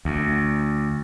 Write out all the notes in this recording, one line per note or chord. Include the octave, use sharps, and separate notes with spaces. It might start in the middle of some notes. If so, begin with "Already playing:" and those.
D2